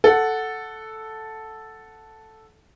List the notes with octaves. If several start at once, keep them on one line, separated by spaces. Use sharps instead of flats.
A4 F#5